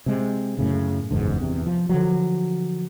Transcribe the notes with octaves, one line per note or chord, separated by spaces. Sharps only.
C3 G#3
F#2 A2 C#3
F#1 E2 G#2 D3
E2 C3
F3
D3 F3 F#3